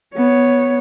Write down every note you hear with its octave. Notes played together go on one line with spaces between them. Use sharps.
B3 C#5